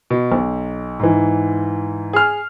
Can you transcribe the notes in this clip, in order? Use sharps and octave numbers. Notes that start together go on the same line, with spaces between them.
B2
B1
G#2 E3
G#4 F6